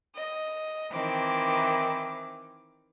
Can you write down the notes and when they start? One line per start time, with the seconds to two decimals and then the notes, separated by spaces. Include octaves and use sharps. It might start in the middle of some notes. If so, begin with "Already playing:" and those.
0.14 D#5
0.91 D#3 E3 C4 D6